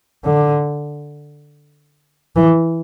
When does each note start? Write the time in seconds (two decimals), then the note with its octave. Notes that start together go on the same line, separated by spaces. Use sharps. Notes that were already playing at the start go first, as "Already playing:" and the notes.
0.24 D3
2.36 E3